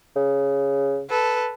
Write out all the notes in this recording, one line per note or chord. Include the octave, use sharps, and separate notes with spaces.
C#3
A4 B4